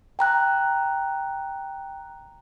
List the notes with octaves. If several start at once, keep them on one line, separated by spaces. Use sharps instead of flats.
G5 A#5 F#6